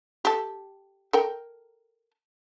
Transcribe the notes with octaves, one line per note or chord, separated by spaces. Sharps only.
G4 A4
A4 A#4 G5